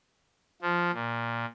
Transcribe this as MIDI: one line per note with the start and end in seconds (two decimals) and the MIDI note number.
0.62 0.91 53
0.93 1.45 46